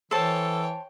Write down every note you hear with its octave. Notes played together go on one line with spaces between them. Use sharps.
E3 A4 C5 C#5 G5 A5